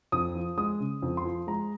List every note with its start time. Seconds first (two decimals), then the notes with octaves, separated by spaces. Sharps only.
0.12 F2 D#6
0.35 F3
0.58 G#3 D#6
0.80 C#3
1.02 F2
1.17 C6
1.25 F3
1.47 G#3 A#5